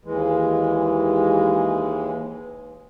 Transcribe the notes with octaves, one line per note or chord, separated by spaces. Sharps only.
D#2 E3 G#3